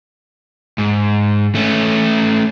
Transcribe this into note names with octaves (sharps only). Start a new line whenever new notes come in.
G#2
A3 C#4